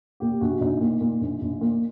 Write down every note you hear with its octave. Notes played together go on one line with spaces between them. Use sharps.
A#2 G4
A#1 F#4
A#1 D#4
A#2
A#2
A#1
A#1
A#2